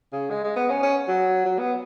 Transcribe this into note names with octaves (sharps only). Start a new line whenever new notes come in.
C#3
G#3
G#3
B3
C#4
C#4
F#3
F#3
B3